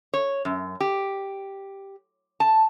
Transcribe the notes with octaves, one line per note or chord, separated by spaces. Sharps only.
C#5
F#2
G4
A5